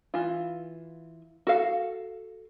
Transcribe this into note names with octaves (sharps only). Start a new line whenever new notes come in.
E3 F4
F#4 A4 F5